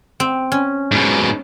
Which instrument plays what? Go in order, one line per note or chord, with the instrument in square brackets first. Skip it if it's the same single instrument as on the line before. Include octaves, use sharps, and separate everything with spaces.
[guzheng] C4
C#4
[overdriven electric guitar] G#2 B2